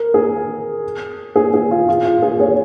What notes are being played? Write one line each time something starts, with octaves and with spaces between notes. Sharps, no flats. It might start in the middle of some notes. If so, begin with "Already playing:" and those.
Already playing: A#4
G#4
G#4
G#4
F4
F4
F4
G#4
G#4 C#5